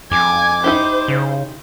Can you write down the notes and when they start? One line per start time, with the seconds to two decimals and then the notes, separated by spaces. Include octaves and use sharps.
0.11 F2 G#5 D6
0.64 D#4 E4 G4 C5
1.08 C#3